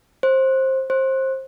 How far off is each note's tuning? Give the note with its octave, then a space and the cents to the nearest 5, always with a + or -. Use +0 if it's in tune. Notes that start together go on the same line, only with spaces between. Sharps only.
C5 +15
C5 +20